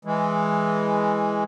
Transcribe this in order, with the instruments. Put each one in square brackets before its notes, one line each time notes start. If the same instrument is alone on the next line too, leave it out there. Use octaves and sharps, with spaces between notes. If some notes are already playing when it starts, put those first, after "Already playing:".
[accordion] E3 G#3